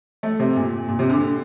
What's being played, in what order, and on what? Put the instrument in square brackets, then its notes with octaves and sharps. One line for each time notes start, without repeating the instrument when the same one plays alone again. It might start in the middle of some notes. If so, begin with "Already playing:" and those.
[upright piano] A3
C3
A#2
A#2
C3
D3